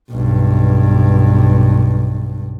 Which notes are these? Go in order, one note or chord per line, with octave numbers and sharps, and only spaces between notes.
B1 G2